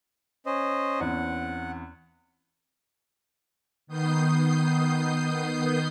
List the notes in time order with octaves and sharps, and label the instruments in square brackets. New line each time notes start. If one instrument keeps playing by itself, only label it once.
[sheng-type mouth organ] C#4 C5 D#5
[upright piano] E2 C4 C#4 [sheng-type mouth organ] F#5
[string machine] D#3 B3 D#6 G6 C7